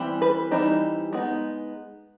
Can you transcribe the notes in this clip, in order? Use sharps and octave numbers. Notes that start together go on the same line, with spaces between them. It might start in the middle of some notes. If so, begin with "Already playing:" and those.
Already playing: E3 G3 C4
B4
E3 G3 C4 D#4
G#3 B3 D#4